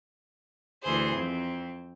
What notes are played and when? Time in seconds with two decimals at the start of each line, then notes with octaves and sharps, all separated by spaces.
0.82 D2 E3 E4 G#4 C5
1.13 F2 C4